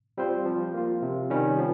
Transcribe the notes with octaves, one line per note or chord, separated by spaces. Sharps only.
G3 C4 F4 C5
F3
A#3 F4
C3
D#3 G3 C#4
F3